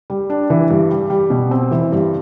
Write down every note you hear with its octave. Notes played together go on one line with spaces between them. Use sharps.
G3
D4
E3
G2
G3
G3
B2
C4
E3
G2